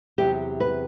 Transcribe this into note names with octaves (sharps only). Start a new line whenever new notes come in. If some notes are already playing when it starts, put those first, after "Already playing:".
E2 C3 F#3 G4
B4